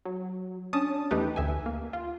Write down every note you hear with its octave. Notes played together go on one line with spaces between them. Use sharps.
F#3
C#4 D4 A5 D#6
E2 A3 D#4 G4 B4
D2 E5 G#5
A#3
F4